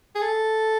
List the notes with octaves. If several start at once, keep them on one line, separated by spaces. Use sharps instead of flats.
G#4
A4